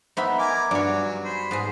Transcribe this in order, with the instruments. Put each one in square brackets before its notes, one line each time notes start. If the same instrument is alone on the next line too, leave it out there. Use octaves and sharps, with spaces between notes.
[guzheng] B3 D#4 [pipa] C5 E5 B5
[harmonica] A#4 G#5 D6
[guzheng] G2 C#5 [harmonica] F#3 [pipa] D5
[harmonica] C5 B5
[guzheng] G#2 [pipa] B3 C4 G#4